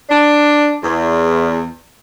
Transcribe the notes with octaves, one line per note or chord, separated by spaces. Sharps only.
D4
E2